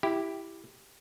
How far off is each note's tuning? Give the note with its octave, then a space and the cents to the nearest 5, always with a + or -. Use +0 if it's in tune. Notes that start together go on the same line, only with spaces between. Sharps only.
E4 +0 G4 +0